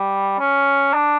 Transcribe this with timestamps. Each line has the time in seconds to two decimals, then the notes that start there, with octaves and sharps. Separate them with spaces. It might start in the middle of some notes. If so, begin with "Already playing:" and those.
Already playing: G3
0.39 C#4
0.93 D4